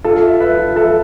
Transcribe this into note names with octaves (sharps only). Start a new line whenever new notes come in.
F4 A4
E5
B4 E5
F4
A4 E5